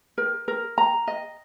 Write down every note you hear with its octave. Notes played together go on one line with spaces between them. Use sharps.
A#4
A#4
A#5
D#5